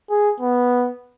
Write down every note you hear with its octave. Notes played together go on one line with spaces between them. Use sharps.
G#4
B3